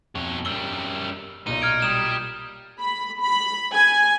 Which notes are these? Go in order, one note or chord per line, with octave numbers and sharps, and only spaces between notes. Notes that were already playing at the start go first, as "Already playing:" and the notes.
F2 B2 C#5
F#2 G3 E6 F#7 G7
B1 A#2 D#4 D#7
F6 G#6 D7
G3 D#6 E7
B5
B5
G#5